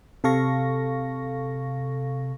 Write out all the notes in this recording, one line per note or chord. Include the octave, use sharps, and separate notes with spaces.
C3 A4 F5 C#6 A#6